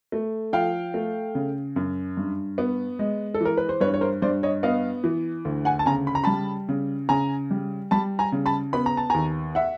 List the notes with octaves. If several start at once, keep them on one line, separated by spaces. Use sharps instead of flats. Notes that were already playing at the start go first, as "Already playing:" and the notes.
A3
F3 F5 G5
A3
C#3
F#2
G2
B3
G#3
A4
E3 A#4
B4
C5
G2 B4 C#5
C#5
A#4 C5
G2 C5 D5
C#5 D#5
B3 D#5 F5
E3
D2
F#5 G#5
A5
C#3 G#5 A#5
B5
A#5
G3 A5 B5
C#3
C#3 G#5 A#5
G3
G3 A5 B5
G#5 A#5
C#3
A5 B5
B3 B5
A#5
A5
D#2 G#5 A#5
E5 F#5